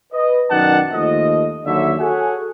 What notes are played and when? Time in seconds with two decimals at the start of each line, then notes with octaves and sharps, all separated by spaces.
0.13 B4 D#5
0.50 F#2 B2 D#3 D5 F#5 A5
0.92 D#2 F3 A3 D#5
1.65 D#2 D3 F#3 C#5 E5
1.98 F#4 G#4 A4 C#5 F#5 G#5